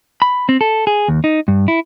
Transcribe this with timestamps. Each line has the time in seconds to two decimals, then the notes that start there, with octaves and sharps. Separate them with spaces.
0.22 B5
0.49 C4
0.61 A4
0.87 G#4
1.08 D#2
1.24 D#4
1.48 G2
1.68 E4